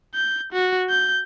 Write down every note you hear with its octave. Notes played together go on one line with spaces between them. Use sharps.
G6
F#4
G6